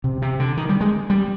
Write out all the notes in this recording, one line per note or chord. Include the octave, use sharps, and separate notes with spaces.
C3
C3
D3
D#3
G3
G#3
G3